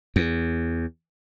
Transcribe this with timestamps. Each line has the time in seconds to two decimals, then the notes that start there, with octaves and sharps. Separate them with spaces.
0.16 E2